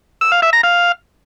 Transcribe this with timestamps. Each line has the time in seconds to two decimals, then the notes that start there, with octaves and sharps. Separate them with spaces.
0.21 E6
0.32 F5
0.42 E5
0.53 A#5
0.63 F5